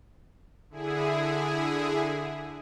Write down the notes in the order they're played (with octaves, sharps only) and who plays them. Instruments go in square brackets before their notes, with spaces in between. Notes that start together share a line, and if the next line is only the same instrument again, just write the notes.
[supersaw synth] D3 E4 G#4